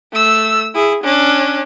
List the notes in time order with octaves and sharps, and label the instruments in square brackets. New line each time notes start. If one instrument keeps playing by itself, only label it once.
[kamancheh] A3 E6
E4 G#4
C#4 D4